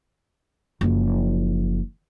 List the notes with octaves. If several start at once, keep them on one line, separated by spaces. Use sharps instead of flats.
F#1 F3